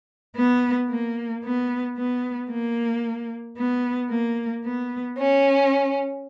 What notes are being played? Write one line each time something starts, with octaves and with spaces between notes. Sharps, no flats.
B3
A#3
B3
B3
A#3
B3
A#3
B3
C#4